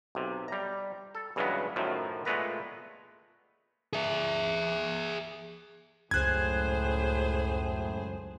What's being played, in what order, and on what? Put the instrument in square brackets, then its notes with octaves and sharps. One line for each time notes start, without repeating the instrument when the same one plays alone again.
[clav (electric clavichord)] B1 C3
G3 A#5
A4
G2 C#3 E3 F#3 G#3 B3
F#2 A2 D#3 F3 F#3
A#2 G#3 A3 B3 B4 A#5
[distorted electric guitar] G#4 E5
[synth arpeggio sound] C#2 F#2 [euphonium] A2 [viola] G#4 C5 [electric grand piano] F#6 G#6